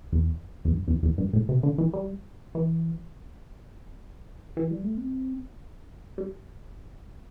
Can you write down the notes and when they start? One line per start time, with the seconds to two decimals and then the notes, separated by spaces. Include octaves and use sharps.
0.12 E2
0.65 E2
0.72 G2
0.88 E2
1.03 E2
1.18 G2
1.33 A2
1.49 C3
1.63 D3
1.78 E3
1.93 G3
2.55 E3
4.57 E3
4.71 G3
4.84 A3
4.97 C4
6.18 G3